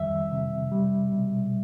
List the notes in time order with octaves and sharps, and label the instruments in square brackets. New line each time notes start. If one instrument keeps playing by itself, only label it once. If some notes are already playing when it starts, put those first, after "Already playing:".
Already playing: [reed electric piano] F2 D#3 G3 E5
C3
G3
B2